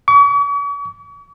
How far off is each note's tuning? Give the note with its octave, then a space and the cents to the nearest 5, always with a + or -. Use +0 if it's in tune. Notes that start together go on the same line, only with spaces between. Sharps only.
C#6 +45